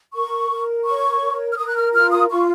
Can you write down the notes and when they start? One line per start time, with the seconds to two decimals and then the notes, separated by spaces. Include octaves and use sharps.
0.13 A#4 C#6
0.50 A#4
0.85 C#5 C#6
1.21 A#4
1.51 F6
1.57 A#4 D#6
1.68 F#6
1.76 F6
1.93 F4 F6
2.10 D#6
2.29 F4 C#6